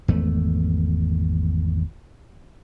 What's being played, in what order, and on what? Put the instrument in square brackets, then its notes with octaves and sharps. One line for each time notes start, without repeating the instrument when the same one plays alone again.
[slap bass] G#1 E2 A3